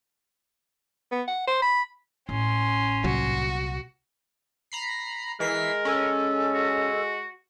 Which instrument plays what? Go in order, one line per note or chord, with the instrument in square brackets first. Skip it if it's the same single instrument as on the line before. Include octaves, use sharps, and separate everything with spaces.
[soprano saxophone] B3
F#5
C5
B5
[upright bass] A1 [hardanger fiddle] C#4 C6
[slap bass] C2 A#2 F#3 [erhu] F#4
[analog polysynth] A#5 B5 C7
[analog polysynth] E3 B6 C7 [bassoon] G#3 [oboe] A#4
[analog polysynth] C#4 [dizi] A4
[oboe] F#4